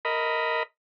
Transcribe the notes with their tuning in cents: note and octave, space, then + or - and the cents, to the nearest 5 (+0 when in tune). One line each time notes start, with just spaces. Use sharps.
A#4 -10 D#5 +15 B5 +0